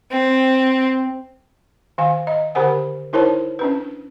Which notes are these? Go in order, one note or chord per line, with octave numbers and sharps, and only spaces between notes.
C4
D#3 F5 G#5
D#5
D3 G4 A#4 C5 F#5 G#5
D#4 E4 A#4 C5 C#5 A5
C#4 D4 B4